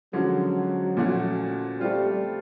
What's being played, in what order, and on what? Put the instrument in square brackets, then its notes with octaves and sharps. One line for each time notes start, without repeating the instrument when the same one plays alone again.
[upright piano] D3 F3 G#3 C#4 F#4 [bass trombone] F#3
[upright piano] A#2 F3 A3 C#4 F#4
[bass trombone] G3 [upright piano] A3 C4 F4